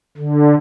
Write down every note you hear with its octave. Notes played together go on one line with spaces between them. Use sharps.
D3